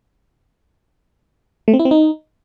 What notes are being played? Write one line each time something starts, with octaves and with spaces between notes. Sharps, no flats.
A3
C4
E4
C4
D#4